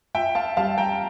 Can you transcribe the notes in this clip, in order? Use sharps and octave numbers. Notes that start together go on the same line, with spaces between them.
F4 E5 G5
F5 A5
G3 F5 A5
G5 A#5